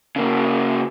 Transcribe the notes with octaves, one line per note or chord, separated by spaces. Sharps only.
C#3 A#3